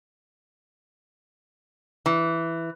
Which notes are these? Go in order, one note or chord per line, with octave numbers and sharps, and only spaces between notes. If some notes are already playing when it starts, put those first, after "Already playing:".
E3